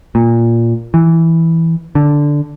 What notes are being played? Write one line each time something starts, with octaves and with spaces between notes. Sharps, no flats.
A#2
E3
D3